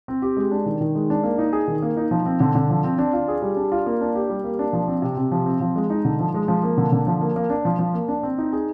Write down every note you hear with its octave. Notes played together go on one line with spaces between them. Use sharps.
C4
G4
G#3
D4
D#3
D#3
G#3
D4
A#3
D#4
G#4
D#3
A#3
D#4
F3
C4
D3
D3
F3
C4
D4
F4
G#4
G3
D4
F4
A#3
D4
G4
G3
A#3
D4
F3
C4
C3
C3
F3
C4
F3
G#3
D#4
D3
F3
G#3
F3
A#3
D3
D3
F3
A#3
A#3
D4
F3
F3
A#3
D4
C4
D#4
G#4